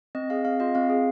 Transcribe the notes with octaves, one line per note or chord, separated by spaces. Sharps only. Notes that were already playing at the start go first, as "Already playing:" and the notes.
C4 D#5
G#4 F5
C4 F5
F4 D#5
C4 F5
G#4